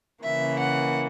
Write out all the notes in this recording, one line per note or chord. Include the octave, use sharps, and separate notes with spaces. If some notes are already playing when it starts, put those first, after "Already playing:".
C#3 E3 A#3 E5
F#5